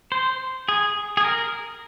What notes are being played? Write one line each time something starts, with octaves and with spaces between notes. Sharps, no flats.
C5
G#4
G#4
A#4